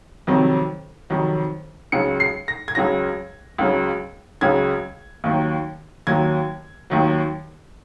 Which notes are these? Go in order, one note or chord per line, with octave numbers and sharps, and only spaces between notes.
F2 C3 D#3 F#3
F2 C3 D#3 F#3
C#2 C#3 F#3 C#7
C7
A#6
G#6
C#2 C#3 F#3 A#6
C#2 C#3 F#3
C#2 C#3 F#3 G#6
D#2 D#3 F#3
D#2 D#3 F#3 G#6
D#2 D#3 F#3